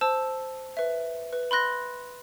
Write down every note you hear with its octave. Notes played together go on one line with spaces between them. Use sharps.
C5 A5 E6
B4 E5
B4
B5 C6 F#6 A#6